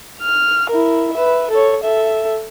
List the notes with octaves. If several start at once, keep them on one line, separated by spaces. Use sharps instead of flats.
F6
E4 A#4
B4 E5
A4 C#5
A4 E5